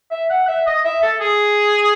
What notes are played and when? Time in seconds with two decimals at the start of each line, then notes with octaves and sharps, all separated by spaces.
0.11 E5
0.30 F#5
0.48 E5
0.67 D#5
0.85 E5
1.03 A4
1.21 G#4